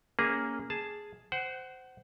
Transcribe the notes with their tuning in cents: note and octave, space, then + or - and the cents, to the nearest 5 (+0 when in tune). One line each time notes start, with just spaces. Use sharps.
A#3 +0 C#4 +10 G#4 -15
G#4 +0 A5 +0
C5 -15 F#5 +20